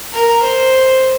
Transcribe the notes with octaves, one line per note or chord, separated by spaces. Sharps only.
A#4
C5